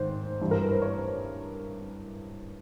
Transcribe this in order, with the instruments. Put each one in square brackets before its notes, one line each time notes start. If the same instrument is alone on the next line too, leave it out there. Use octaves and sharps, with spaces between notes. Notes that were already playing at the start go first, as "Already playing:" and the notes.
Already playing: [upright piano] G#2 D#3 C5
G2 E3
A#4
B4
C5
C#5